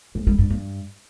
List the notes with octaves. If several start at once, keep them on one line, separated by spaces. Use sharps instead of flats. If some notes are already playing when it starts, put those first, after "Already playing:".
G#2
G3
G2
G2